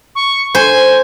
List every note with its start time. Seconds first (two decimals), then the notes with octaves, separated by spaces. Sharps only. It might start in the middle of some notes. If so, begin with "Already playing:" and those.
0.15 C#6
0.55 C5 G#5